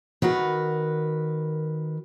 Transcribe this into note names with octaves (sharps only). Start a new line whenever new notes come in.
D#3 F#4 A#4 B4